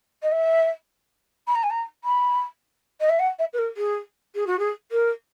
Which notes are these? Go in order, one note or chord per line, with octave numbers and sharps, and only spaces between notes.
D#5
E5
B5
A#5
G#5
A#5
B5
D#5
E5
F#5
E5
B4
A#4
G#4
G#4
F#4
G#4
A#4